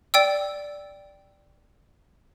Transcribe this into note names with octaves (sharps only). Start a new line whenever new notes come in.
D5 G5 E6